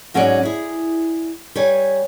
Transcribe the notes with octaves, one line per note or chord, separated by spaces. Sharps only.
G#2 F#3 C#4 G#4 D5 F#5
E4 G#4
G3 C#5 G#5